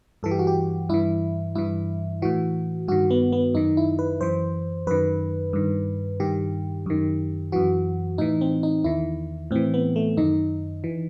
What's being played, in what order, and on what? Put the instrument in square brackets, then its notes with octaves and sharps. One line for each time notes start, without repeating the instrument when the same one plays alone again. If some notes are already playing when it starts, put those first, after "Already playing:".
[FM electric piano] G2 E3 A4
G4
F#4
G4
G2 E3 E4
G2 E3 E4
A2 E3 F#4
G2 D#3 F#4
B3
B3
F#2 D#3 D#4
E4
B4
F#2 E3 C5
F#2 D#3 B4
G2 D#3
G2 D#3 G4
F#2 D#3
F#2 E3 F#4
A2 E3 D#4
C4
D#4
E2 D#3 E4
A2 E3 C4
B3
A3
F#2 D#3 D#4
E3